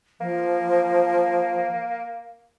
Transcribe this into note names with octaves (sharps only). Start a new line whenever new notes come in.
F3 A#3